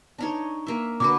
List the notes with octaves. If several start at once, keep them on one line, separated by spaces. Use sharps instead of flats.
D4 D#4 C#5
A#3 E5
D3 F#4 B4 D6